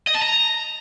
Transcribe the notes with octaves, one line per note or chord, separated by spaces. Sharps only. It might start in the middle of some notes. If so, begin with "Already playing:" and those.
D#5
A5
A#5